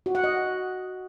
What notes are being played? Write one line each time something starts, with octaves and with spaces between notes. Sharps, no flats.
F#4
F#5
D#5